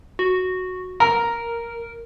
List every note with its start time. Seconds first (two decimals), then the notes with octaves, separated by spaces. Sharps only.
0.19 F#4
1.00 A#4 A#5